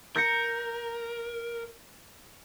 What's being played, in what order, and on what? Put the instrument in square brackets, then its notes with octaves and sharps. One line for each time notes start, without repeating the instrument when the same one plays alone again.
[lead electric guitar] A#4 [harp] G6 A#6 C#7